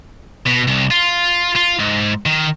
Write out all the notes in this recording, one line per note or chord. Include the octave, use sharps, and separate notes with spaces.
B2
C2
F4
F4
G#2
D#3